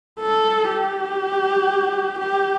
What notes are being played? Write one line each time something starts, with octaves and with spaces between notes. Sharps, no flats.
A4
G4
G4